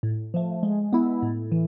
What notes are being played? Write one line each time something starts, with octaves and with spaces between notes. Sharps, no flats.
A2
F3 A3
G#3
B3 E4
A2
E3